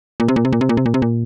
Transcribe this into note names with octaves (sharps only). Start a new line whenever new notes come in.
A#2
C3
A#2
C3
A#2
C3
A#2
C3
A#2
C3
A#2